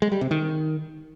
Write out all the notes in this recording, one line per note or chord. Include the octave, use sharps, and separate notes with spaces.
G#3
G3
C3
D#3